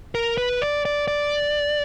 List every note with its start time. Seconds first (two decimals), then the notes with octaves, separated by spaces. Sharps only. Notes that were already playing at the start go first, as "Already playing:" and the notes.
0.15 A#4
0.38 B4
0.62 D5
0.85 D5
1.08 D5